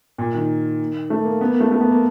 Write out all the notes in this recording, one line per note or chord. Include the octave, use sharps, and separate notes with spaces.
A#2
D#3
A3
A#3
B3
A#3
A3
A3
B3
A#3